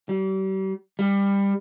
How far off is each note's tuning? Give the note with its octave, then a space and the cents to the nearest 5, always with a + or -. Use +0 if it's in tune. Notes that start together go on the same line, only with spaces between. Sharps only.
G3 -40
G3 +20